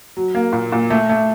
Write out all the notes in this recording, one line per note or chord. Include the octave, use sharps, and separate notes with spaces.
F#3
A#3
A#2
A#2
A3
A3